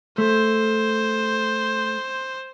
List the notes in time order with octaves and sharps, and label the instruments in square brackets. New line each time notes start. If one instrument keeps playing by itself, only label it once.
[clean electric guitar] A3 [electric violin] C5